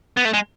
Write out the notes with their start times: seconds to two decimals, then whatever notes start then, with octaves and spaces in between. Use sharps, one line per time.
0.17 B3
0.25 A3
0.34 G#3